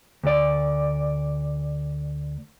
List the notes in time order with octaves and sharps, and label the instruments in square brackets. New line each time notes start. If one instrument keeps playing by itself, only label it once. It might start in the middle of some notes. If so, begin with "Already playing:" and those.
[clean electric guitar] D2 D5